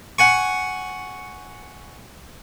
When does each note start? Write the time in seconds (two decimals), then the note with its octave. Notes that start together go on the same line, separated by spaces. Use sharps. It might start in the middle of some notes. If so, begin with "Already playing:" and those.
0.19 F#5 G#5 C#6